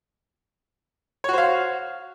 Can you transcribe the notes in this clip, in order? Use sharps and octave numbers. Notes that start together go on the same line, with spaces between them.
F#4 C5 C#5 F5